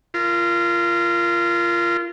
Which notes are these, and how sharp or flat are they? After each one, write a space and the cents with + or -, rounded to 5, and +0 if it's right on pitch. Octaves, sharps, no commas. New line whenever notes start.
F4 -25 A#4 +0